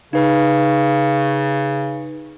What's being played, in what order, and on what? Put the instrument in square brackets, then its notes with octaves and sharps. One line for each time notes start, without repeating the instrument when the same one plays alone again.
[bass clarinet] C#3 [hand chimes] D#4 B4